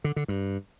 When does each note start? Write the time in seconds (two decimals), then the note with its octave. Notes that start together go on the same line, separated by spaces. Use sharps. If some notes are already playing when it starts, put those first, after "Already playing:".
0.04 D3
0.16 D3
0.28 G2